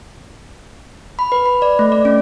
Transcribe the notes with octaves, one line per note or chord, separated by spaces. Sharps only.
B5
B4
B5
D5
A3
D5
C#4